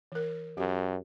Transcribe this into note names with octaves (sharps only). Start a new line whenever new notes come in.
E3 A#4
F#2 G4